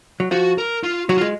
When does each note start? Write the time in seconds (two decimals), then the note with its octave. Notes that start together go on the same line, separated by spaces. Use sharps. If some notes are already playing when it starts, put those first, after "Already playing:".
0.20 F#3
0.31 F3 F#4
0.58 A#4
0.83 F4
1.09 F#3 F#4
1.18 F4
1.21 G#3